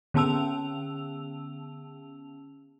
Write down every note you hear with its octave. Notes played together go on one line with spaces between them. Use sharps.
D3 B3 C#4 A5 E6 F7